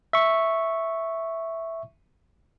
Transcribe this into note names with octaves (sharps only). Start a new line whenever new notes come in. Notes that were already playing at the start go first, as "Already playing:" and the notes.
E5 C#6